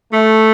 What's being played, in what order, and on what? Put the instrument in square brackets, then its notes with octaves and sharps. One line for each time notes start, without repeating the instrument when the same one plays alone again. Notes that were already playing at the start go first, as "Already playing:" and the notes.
[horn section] A3